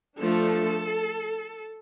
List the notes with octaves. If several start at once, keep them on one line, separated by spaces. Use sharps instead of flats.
F3 A3 D4 A4